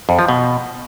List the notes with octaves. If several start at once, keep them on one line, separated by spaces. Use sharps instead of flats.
F2
F3
B2